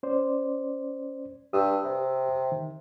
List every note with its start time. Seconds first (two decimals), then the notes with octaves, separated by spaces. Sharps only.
0.03 C#4 C5 D5
1.53 G2 G4 D#6 E6
1.84 C3
2.52 D#3